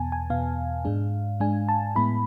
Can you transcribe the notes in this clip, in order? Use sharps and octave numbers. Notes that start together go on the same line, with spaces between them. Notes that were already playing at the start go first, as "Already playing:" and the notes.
Already playing: E2 B2 B3 G#5 A5
G#5
E2 B2 B3 F5
G#2 G#3 D4
G#2 G#3 D4 G#5
A5
A2 G#3 B3 E4 B5